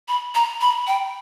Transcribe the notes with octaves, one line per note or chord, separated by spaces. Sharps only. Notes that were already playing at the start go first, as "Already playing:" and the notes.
B5
A#5
B5
G5